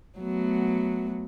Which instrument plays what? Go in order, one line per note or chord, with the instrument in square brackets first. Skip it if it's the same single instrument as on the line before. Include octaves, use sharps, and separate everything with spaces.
[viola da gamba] F#3 A3 B3